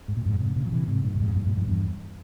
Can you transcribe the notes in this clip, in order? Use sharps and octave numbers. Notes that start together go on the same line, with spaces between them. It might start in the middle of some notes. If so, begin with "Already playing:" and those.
G#2
A#2
F2 G#2
G#2 C3
A#2 C#3
F3
C3 E3
G#2 C3
G2 A#2
G2
F2 G#2
G2 A#2
G2 A#2
F2 G#2
E2 G2